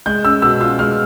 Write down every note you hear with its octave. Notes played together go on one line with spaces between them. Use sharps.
G#3 G6
C#4 E6
B2 E6
F4 E6
G#3 F6